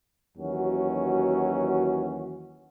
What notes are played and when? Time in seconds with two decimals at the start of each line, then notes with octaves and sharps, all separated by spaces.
0.38 D#2 E3 F#3 C#4 F#4